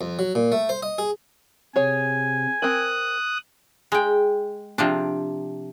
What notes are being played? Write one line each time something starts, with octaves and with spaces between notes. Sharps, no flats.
F2
F#3
A#2
A3
C5
D#5
G#4
C3 G#4 C#5 G#5
C4 A#4 D#6 F#6
G#3 G5
C3 F3 D4